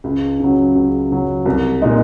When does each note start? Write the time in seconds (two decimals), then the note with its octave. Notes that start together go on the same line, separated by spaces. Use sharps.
0.04 C#2
0.40 C#3 F#3
0.75 C#2
1.10 C#3 F#3
1.45 C2
1.82 A#2 G#3 D#4